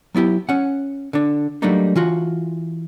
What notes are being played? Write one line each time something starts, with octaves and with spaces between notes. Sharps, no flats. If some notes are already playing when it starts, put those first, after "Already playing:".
F#3 B3 E4 G4
C#4 F#5
D3 D4
F#3 G3 A3 A#3 D4 D#4
E3 F4 F#4